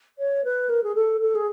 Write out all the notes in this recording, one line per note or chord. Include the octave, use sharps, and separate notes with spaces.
C#5
B4
A#4
G#4
A4
A4
G#4